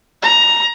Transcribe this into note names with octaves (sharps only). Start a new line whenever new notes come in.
A#5